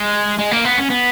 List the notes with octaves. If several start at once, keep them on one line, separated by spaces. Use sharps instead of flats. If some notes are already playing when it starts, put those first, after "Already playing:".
Already playing: G#3
G#3
A#3
B3
C#4
B3